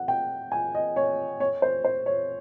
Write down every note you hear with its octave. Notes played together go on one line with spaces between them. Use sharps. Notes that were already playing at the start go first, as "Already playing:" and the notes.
Already playing: F#5
G5
G#5
D#5
C#5
C#5
C5
C5
C#5